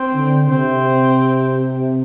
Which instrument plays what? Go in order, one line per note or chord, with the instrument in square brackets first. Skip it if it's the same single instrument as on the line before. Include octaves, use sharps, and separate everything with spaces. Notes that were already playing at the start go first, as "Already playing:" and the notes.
Already playing: [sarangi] C4
[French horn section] D3
[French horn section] C3 [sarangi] C4